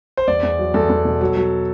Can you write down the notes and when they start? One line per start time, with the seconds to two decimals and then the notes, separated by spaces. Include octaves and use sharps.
0.17 C5
0.28 E2 D5
0.43 E2
0.59 F#3
0.74 E2 A4
0.90 E2
1.05 B2
1.21 F#3
1.36 F#3